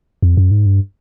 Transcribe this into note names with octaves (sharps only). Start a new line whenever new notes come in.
F2
F#2
G#2
G2